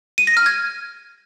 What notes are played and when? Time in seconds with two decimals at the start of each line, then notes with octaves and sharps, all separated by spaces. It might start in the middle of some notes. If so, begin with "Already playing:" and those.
0.18 D#7
0.27 A#6
0.37 F6
0.46 G#6